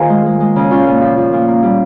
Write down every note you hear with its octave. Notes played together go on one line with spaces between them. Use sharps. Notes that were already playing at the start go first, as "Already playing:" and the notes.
Already playing: D#3 A#3 F4 G#4 A#4 C5 F5
G#3
G#3
G#3
C#3
A#2 C#4 F4
A#2
F3
F3
A#2
A#3
G3